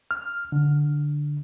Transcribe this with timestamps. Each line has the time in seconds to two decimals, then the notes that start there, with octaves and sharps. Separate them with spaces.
0.11 F6
0.52 D3